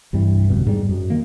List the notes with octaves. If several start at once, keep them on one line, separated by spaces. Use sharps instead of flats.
C2 G2 E3 G3
F1 B2 D3
G#2 G3
F#2
D#3 A#3